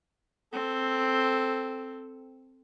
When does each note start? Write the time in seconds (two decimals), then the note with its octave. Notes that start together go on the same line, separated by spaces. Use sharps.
0.53 C4 A4